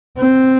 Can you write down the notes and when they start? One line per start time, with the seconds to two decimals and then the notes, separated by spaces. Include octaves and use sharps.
0.18 C4